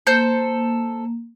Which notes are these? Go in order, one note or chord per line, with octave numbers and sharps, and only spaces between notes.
A#3 A4 C5 G6